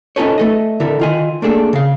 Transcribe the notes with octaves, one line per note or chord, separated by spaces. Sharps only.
C#4 D#4 F4 A4 B4 C#5
A3 A4 D#5
D3 E4 A4 A#4
D#3 F4 G#5
A3 A#3 D4 G#4 A4
C#3 F5